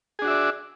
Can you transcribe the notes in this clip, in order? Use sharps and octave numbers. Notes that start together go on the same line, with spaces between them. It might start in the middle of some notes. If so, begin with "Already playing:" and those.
D4 F#4 G#4 D5 E5